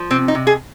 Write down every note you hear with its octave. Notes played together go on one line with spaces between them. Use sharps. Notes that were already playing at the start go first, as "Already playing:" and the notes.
Already playing: F3
C3 C4
D#4
C3
G#4